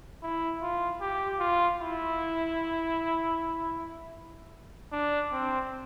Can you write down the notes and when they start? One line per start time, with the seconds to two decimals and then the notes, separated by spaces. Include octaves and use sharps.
0.23 E4
0.62 F4
1.01 G4
1.40 F4
1.80 E4
4.93 D4
5.32 C4